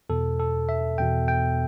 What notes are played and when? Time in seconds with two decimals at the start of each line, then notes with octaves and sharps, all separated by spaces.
0.09 E2 B2 A4
0.40 A4
0.69 E5
0.98 E2 B2 G5
1.28 G5